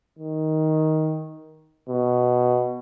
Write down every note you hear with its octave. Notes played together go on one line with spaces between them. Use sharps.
D#3
B2